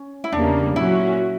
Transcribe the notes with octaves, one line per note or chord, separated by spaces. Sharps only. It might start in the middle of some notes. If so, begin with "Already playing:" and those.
Already playing: C#4
E4
E2 C#3 G3 A#3 D4
A#2 F#3 C#4 E4 F#4